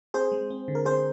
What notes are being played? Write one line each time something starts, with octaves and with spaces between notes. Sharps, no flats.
C4 G#4 C5
G#3
C4
D3
A#4
C4 G#4 C5